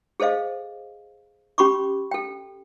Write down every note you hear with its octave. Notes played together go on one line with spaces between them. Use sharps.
G#4 A4 C5 D#5 F5
C#4 G4 B5 C#6 D6
A4 G5